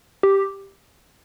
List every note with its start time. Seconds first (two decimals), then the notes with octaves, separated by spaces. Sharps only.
0.23 G4